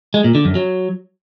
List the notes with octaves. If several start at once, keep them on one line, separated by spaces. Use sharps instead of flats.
G#3
A#2
D3
F#2
F#3